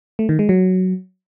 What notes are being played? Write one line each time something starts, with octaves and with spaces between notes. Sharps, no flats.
A3
D#3
G#3
F#3